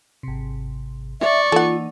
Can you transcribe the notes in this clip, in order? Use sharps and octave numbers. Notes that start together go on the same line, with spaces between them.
G#1 C3
D5 E5 C#6
E3 A#3 D#4 F4 A4 F#5